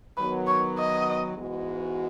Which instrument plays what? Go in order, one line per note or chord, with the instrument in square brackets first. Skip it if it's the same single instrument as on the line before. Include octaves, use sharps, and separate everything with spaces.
[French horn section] D#3 F#3 B3 [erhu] B4
[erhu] C#5
D#5
[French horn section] G#2 E3 G#3 B3 F#4